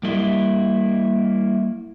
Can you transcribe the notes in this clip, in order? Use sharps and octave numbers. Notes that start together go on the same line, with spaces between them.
G3 A#3 E4 D#5